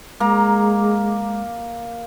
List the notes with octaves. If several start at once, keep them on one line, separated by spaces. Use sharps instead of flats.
G#3 A#3 A#5